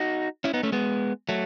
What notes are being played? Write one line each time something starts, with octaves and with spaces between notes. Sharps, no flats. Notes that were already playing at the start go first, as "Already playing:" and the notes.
Already playing: D#4 F#4
C#4 E4
B3 D#4
A3 C#4
G#3 B3
F#3 A3